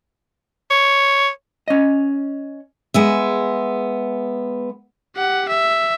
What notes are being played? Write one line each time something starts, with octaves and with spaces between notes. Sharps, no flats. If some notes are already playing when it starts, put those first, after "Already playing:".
C#5
C#4 D#5
G#3 B3 E5
G4 F#5
E5